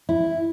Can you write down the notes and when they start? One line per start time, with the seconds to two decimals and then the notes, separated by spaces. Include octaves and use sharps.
0.09 E4